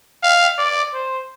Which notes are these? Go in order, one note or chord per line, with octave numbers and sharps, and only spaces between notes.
F5
D5
C5